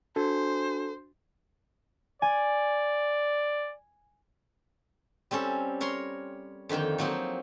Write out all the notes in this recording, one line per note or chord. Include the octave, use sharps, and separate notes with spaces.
D4 F#4 A4 C5
D5 G#5
G3 C4 C#4 A4
A#4 C#5 A#5 C6
F2 D3 D#3 A#3 G5
F3 F#3 A#3 C4 D#4